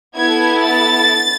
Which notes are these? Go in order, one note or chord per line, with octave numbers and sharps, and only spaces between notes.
B3 E4 A4 G#6
A6